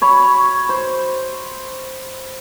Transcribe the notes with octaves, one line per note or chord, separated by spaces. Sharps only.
C#5 B5
C5